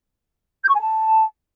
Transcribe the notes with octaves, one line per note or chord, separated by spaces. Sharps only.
G6
C#6
G#5
A5